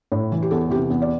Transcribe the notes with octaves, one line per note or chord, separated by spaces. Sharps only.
A2
E3
G4
E2 A4
C3 E3 G4
E2
D5